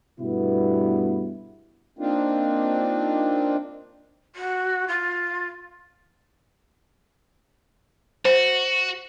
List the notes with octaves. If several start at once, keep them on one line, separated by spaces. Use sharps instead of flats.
G2 B2 A3 B3 E4
A#3 C4 D4 D#4 F4
F#4
F4
F#4 C5